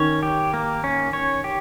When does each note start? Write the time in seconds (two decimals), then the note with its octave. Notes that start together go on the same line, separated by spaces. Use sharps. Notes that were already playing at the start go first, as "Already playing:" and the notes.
Already playing: D#3 C#4 C#5
0.23 G4
0.54 A#3
0.84 C#4
1.13 C#5
1.44 G4